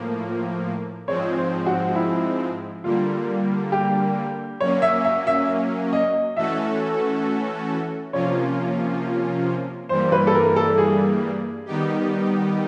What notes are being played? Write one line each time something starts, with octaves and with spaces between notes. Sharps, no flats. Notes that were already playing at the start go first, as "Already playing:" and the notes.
Already playing: A2 F3 A#3
G#2 F3 G#3 C4 C#5
C5
F#4
E4
D3 G3 A#3 F4
G4
F#3 A#3 C#4 C#5
E5
E5
E5
D#5
E3 A3 C#4 F#4 A4 E5
C3 F3 A#3 C#4 F4 C#5
G2 E3 G3 A#3 C5
B4
A4
A#4
A4
G#4
D#3 G3 B3 D#4 G4